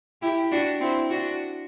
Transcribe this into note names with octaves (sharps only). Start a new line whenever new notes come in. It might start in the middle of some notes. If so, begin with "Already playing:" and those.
E4 G4
D4 F#4
C4 E4
D4 F#4